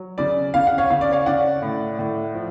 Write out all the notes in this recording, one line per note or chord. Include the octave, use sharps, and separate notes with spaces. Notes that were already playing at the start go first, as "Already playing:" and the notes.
Already playing: F#3
C#3 D5
C#3 F5
F#5
C#5 F5
C#3 F5
D5
C#5 F5
C#3 D5 F#5
A2
A2
F3